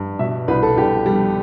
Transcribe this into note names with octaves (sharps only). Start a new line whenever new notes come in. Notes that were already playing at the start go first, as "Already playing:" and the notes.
Already playing: G2
B2 E5
C2 B4
A4
C2 G4
G3